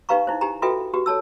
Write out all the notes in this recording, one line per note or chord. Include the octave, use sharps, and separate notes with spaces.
D#4 G4 B4 F5 A#5 C#6
D#4 E4 C5
D#4 G4 G#5 A#5
F4 F#4 A4 B4 E5 G5
F#4 G4 B4
A4 C#5 A5 E6